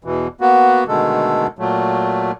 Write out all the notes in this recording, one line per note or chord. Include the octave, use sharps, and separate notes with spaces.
E2 B2 E3
A#3 B3 F#4
B2 D3 D#3 G#3 A3 A4
A#2 F#3 A3